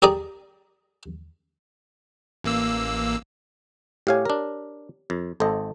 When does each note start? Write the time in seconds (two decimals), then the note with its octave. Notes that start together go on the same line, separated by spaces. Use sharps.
0.02 G4 G#4 D5 A#5 D#6
2.44 A1 A#3 E6
4.07 A2 G4 C#5 F5 G#5
4.25 D4 A#4
5.10 F2
5.40 G#1 A4 C5 D#5